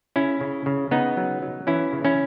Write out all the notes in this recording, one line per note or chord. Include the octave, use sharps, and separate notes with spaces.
C#3 C#4 E4
C#3
C#3
C#3 B3 D#4
F#3
F#3
E3 C#4 E4
C#3
C#4 E4